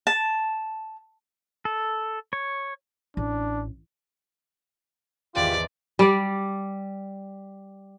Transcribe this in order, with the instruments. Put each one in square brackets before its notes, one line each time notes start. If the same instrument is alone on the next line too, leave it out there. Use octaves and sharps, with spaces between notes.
[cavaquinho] A5
[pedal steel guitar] A4
C#5
[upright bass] A1 [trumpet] D4
[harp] G#1 E2 B4 [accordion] F4 G4 [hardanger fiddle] D5
[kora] G3 D5